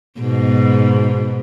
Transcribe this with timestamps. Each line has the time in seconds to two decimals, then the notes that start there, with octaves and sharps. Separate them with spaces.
0.20 G#2 B2